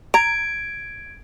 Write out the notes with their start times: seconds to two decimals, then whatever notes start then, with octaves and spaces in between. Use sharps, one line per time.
0.14 A#5 G#6 D7